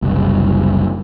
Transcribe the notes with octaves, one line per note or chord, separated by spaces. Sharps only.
F#1 C2